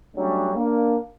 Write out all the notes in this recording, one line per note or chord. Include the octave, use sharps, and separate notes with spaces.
F#3 G3 A3 C#4 D4
A#3 D4